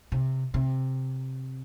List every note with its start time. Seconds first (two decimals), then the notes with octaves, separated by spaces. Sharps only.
0.12 C3
0.54 C3